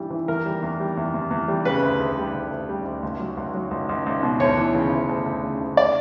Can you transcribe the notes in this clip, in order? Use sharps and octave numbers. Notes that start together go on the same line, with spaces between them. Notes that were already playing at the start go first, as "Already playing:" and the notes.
Already playing: G2 E3 G3
E3
E2 A#4
G3
E2
G3
E2
E2
E2
G3
C#3 B4
D2
D2
G3
D2
D2
G3
D2
C#2
F#3
C#2
F#3
C#2
C#2
C#2
B2
D2 C#5
E3
C#3
D2
D2
D2
C#3
D2
D5